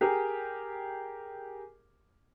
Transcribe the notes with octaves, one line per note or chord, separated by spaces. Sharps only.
G4 G#4 A#4